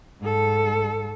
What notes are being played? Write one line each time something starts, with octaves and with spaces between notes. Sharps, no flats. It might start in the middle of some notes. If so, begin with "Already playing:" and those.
G#2 A4